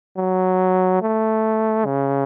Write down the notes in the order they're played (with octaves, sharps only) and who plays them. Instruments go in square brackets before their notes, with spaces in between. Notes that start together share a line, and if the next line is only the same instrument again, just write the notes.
[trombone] F#3
A3
C#3